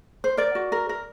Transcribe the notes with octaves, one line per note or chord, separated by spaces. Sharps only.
C5
A#4 D5
F#4
A#4
A#4